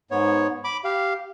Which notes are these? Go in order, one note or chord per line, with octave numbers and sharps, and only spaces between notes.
G#2 B3 C#5
B5 D6
G4 F5